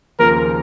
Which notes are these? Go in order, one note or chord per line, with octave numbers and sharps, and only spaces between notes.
D#2 C#3 F3 A#3 F4 A#4